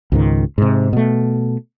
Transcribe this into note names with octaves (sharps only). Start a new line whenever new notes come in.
C#2 G#2 D#3
G#2 C3
B2 A3